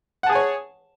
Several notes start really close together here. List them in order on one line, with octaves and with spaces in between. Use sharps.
F#5 A5 G#4 G#5 C#5